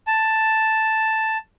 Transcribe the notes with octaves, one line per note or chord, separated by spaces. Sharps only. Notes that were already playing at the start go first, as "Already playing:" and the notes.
A5